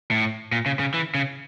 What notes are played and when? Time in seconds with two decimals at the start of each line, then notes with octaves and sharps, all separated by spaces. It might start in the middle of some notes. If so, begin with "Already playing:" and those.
0.11 A2
0.52 A#2
0.66 C#3
0.79 C#3
0.94 E3
1.15 C#3